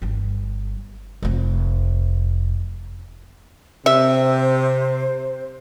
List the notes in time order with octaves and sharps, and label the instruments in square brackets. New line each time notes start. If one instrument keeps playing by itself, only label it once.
[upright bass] G1 G2
F1 F2
[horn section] C3 [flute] C5 [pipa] E5